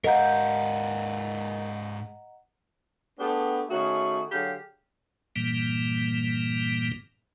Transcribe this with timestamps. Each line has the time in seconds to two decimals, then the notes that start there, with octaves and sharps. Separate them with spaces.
0.04 G#2 A#4 D#5 F5 F#5 A#5 G6
3.19 A3 B3 D4 G4 G#4
3.70 D#3 A3 C#4 F#4 G#4
4.32 D3 F#3 G4 G#4 F5
5.36 G2 A#2 E3 G3 A#3